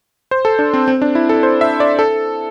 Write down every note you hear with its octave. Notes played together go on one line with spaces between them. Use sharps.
C5
A4
D4
C4
C4
D4
E4
A4
C5
E5
D5
A4